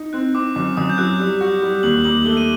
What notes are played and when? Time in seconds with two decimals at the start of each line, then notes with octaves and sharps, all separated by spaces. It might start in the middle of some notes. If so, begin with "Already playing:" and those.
Already playing: D#4
0.13 C4 F#6
0.34 C4 D6
0.55 F#2 D6
0.77 F#2 D#6
0.90 G6
0.98 F#3 F#6
1.20 G3
1.41 F#4
1.62 G3
1.83 D#2 F#7
2.04 D#2 F#7
2.25 A3 G7
2.37 D#7